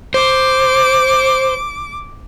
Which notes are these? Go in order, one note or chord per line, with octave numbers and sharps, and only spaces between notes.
C5 D6